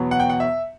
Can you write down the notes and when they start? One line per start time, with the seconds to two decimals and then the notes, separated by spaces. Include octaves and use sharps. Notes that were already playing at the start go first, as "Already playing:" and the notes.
Already playing: E2 B2 F#3 B3
0.11 F#5
0.20 G5
0.30 F#5
0.40 E5